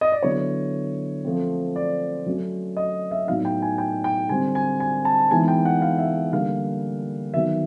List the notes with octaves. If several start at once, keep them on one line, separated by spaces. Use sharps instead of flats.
D#5
D5
D3 F#3 B3 E4 C#5
F3 A3 C4
D5
F#3 A3 C#4
D#5
E5
A2 F#3 B3 D#4 F5
G5
G#5
G5
G5
D3 G3 C4 G#5
G#5
G#5
A5
E3 G#3 B3 D#4 G#5
G5
F#5
F5
E5
D3 G3 A#3 D4 F5
D#3 F#3 B3 E5